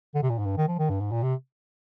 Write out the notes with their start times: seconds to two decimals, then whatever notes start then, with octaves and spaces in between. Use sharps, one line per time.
0.14 D3
0.23 C3
0.30 A#2
0.39 G#2
0.46 G2
0.57 D#3
0.68 F3
0.79 D#3
0.90 G2
1.01 G#2
1.11 A#2
1.23 C3